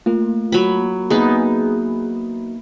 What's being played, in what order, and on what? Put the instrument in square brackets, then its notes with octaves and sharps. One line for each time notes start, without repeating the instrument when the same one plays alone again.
[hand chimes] A3 [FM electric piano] A#3 F4
[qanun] F#3 B5
[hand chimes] A#3 [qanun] B3 D#4 [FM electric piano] G#4